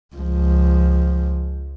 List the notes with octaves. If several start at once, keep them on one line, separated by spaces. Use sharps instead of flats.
C#2 F3